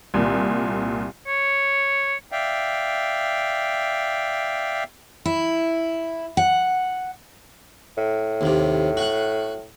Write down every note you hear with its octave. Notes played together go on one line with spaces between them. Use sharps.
C2 A#2
C#5
D5 E5 F5 G5
E4
F#5
A2
D#2 C3
F#4 F#5